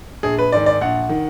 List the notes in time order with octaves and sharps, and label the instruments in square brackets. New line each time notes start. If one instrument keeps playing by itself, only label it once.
[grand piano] A#1 G#4
B4
G#2 D#3 D5
D5
A#1 F#5
D#3